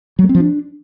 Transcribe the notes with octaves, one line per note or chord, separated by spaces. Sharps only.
F#3
A3
C4
F3
D4